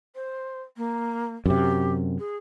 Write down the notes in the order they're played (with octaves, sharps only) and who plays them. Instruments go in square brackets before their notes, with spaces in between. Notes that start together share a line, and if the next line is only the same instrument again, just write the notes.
[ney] C5
A#3
[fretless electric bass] F#2 C3 [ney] G4
[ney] G#4